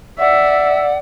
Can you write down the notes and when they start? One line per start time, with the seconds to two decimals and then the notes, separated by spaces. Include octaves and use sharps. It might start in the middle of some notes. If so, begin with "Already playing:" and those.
0.19 D5 E5 F#5